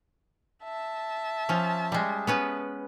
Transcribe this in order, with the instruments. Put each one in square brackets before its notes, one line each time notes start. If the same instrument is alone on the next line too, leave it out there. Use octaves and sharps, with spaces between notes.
[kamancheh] E5 A5
[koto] F3 C#4
G3 G#3
B3 C#4 B4